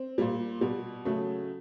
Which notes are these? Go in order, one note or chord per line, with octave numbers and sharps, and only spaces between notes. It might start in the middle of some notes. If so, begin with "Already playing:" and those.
Already playing: C4
A#2 G3
B2 G3
C#3 F#3 A3